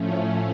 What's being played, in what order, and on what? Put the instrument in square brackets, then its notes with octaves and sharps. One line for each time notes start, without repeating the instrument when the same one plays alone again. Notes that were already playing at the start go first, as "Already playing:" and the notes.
Already playing: [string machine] A2 F3 A3 C#4